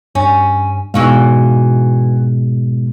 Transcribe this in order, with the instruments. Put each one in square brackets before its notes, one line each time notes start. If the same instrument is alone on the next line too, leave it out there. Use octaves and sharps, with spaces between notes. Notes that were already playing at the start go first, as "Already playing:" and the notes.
[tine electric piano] G2 [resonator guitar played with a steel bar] C#4
[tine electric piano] G#2 B2 G#3 [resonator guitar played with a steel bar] E3 F#4 F5